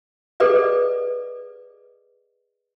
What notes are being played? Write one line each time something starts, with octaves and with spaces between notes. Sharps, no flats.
G#4 A4 B4 D5 D#5